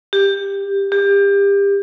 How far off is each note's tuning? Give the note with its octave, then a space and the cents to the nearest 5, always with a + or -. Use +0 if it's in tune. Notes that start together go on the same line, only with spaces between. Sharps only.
G4 +15
G4 +30